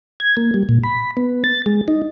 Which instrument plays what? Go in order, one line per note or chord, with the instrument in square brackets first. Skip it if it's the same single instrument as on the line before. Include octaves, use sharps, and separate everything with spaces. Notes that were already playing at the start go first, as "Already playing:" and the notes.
[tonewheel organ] G#6
A#3
G3
A#2
B5
B3
A6
G#3
D#4